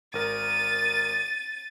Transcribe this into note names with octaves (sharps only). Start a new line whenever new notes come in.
G#1 A#4 A6 D#7